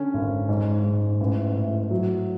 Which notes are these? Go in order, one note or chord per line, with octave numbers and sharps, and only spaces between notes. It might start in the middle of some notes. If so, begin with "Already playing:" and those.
Already playing: D3 C#4
G#1
G#2
G#2
A1
A2
F#3